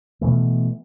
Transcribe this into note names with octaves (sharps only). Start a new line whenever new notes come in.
B2 E3 A3